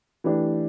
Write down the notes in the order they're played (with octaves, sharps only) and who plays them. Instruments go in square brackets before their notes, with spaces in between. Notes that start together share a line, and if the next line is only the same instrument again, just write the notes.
[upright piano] E3 A3 D4 G4